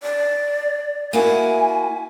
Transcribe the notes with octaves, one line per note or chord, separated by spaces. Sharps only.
D5
A#3 E4 F#4 G#5